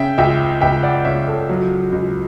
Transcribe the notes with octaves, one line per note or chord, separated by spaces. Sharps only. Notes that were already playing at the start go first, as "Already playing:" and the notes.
Already playing: C#3 E5 G5
C#2 E5 G5
C#2 E5 G5
D5 F#5
C#2 C#5 E5
A4 C#5
F#3
C#2